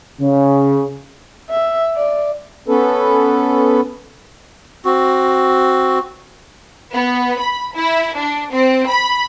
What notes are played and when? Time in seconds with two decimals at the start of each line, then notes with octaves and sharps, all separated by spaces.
0.21 C#3
1.50 E5
1.97 D5
2.68 B3 C#4 A4 B4
4.85 C4 F#4
6.93 B3
7.39 B5
7.75 E4
8.16 D4
8.52 C4
8.89 B5